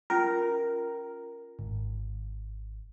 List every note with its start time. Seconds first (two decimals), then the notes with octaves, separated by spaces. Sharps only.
0.10 C#4 F4 A#4
1.59 G#1